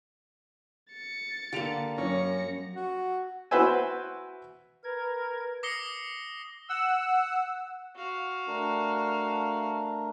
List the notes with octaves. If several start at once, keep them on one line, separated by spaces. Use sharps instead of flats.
A6 C#7
D3 A#3 G4 D7 F7
F#2 C#4 A#6 C#7
F#4
E4 F#4 B4 C5 E5 G#5
A#4 B4 G#6
D6 D#6 A#6 C7 C#7 G7
F#5 E6
F#4 F5
A3 D4 A#4